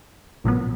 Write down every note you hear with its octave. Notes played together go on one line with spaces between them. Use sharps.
A#1 A#2 F#3 B3